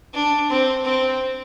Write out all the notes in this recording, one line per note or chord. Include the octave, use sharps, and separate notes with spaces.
D4
C4
C4